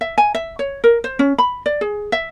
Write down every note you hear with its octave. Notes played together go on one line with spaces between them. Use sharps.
E5
G#5
E5
C#5
A#4
C5
C#4
B5
D5
G#4
E5